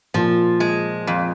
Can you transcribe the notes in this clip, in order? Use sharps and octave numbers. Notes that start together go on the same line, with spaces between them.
A#2 F3
G#3
F2